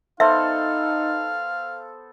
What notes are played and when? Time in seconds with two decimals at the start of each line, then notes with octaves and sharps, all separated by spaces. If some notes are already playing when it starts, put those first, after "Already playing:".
0.20 B3 D#4 A4 C5 E5 F5